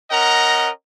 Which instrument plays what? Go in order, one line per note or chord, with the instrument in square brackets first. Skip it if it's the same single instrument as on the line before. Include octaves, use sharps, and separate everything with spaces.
[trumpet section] C#4 A#4 D#5 F#5 A#5